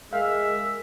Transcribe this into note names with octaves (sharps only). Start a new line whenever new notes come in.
G#3 A#4 E5 F5